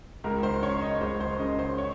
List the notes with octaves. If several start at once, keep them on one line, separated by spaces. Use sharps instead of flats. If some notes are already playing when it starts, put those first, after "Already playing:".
C#2 A#4
C5
C#3 C#5
D#5
C#2 C5
C5
C#3 D#5
C5
C#5